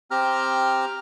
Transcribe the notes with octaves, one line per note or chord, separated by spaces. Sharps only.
C4 G4 A#5 F6